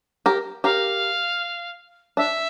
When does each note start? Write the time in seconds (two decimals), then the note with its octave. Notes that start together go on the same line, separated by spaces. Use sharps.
0.26 G4 A#4
0.64 G4 A#4 F5
2.17 D4 E5